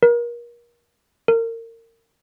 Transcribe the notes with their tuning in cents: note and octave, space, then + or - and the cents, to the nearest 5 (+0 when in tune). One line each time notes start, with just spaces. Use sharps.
A#4 +35
A#4 -30